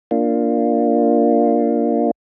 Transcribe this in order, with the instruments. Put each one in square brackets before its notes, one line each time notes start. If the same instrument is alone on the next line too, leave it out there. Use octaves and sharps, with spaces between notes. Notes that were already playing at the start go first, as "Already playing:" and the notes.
[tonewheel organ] A#3 D4 F4